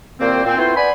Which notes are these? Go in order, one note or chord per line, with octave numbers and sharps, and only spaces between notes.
C2 A#2 D#3 A#3 C4
A#2 C4
A3 B3 C4 E4 F4 C5
B3 D5 G#5 B5